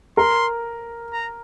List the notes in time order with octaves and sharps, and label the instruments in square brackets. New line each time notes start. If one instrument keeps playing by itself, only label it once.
[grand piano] A#4 [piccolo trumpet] C6
[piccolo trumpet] A#5